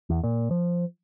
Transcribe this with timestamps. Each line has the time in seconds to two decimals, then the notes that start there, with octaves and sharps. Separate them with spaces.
0.10 E2
0.23 A#2
0.51 F3